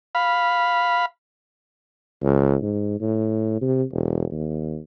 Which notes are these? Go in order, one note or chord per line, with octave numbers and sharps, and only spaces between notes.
F5 B5
C#2
G#2
A2
C3
E1
D#2